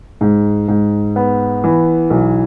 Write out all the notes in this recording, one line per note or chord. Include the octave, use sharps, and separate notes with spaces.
G#2
G#2
B3
E3
B1